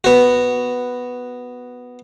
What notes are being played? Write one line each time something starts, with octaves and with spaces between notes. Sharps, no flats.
B3 F#4